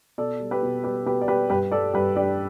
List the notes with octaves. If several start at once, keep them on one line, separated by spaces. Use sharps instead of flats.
B2 A4 D5
G3
G4 B4
B2
G3 G4 B4
B2 G4 B4
D5
G3 G4 B4
G2 G4 B4
G3 A4 D5
G2 G4 B4
G3 D4 G4